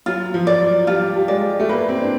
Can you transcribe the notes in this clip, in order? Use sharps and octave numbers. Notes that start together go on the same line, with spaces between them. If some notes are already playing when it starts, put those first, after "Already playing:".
F#3 F4
F3
D5
F#3
G3 F4
G3
G#3 D5
A3
A#3 B4
C4
D4